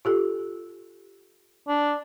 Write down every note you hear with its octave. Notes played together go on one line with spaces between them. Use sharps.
F4 G4 A4
D4